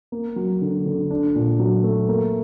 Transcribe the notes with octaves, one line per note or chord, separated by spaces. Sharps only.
A#3
F#3
D3
D3
D4
A#2
F#3
A3
A#3